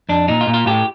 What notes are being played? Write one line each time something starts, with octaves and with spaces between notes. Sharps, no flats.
F2 D4
A#2 D#4
F4
A#2
F4
A2 G4